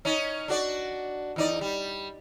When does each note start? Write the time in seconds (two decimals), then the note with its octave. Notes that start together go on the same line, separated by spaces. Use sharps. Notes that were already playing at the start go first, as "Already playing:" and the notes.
0.05 C#4 D#4
0.48 D4 F#4 D5
1.36 E2 D#4 D5
1.61 G3